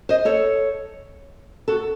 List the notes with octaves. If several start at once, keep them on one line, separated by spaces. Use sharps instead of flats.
C5 D#5
A4 C#5
F#4 A4